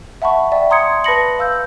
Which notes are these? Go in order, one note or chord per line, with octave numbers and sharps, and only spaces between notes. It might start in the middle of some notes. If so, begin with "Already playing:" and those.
E5 F#5 A5 B5 C#6
D5 E5 G5
A#5 C6 D#6 G#6 C#7
B4 A5 B5 A#6 C#7 F#7
F5 E6 G6